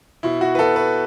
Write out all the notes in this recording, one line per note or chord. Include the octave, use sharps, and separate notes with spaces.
B2 E4
F#4
B4
B2 A4
B4